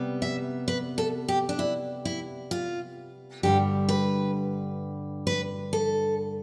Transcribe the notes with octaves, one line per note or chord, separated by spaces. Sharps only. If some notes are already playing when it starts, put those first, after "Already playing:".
Already playing: C3 G3 B3
E5
B4
A4
G4
D4
E4
E4
F4
G2 D3 G3 G4
B4
B4
A4